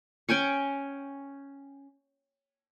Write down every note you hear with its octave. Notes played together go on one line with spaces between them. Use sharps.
C#4 G5 G#5 C#6